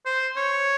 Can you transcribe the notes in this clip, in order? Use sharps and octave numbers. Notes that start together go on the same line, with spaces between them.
C5
C#5